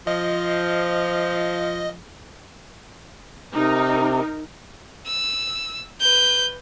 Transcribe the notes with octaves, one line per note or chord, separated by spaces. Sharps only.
F3 D#5
C3 D#4 A#4
E6
B4 G6